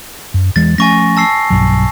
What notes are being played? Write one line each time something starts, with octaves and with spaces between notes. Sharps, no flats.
F#2
E2 E3 G#3 A6
F3 A3 C#4 G#5 C#6 A#6
A5 E6 C7
B1 G2 F#3